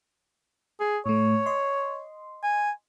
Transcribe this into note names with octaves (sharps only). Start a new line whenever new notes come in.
G#4
A2 A3 C#5
D#5 C6
G#5